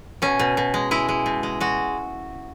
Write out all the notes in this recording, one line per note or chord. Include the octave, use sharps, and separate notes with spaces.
B2 C#4
B2
B2
G#3
G#3 E4
G#3
B2
G#3
G#3 F#4